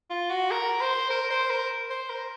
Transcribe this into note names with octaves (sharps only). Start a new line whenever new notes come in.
F4
F#4
A#4
C5
A#4
C5
A#4
C5
A#4